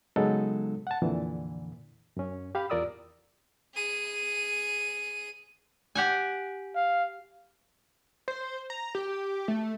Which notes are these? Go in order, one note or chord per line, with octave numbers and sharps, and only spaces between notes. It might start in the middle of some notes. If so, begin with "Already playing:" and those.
C#3 F#3 G#3 B3 D#4 A4
F#5 A5
F2 A#2 D3 E3
F#2 C#4
G4 F5 B5
E2 F4 A#4 D5 D#6 E6
G#4 D#7
G4 F#5 G#5
F5
C5
A#5
G4
A3